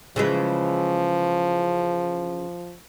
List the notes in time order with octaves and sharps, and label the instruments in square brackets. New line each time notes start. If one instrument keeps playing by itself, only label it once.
[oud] C#3 E3 G#3 [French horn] F3